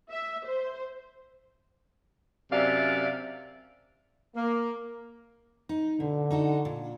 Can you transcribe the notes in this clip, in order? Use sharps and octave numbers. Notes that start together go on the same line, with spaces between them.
E5
C5
F#2 C3 D4 D5 E5 F5
A#3
D#4
B2 D3
D#4 F#4 A4
A#2